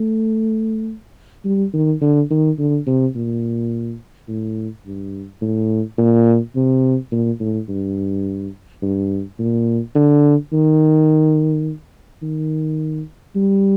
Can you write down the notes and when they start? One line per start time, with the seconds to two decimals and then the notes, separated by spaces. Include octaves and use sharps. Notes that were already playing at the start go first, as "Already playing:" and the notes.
Already playing: A3
1.45 G3
1.73 D#3
2.01 D3
2.30 D#3
2.58 D3
2.87 C3
3.15 A#2
4.28 A2
4.86 G2
5.41 A2
5.98 A#2
6.56 C3
7.12 A#2
7.40 A2
7.69 G2
8.82 G2
9.39 A#2
9.95 D3
10.53 D#3
12.22 D#3
13.36 G3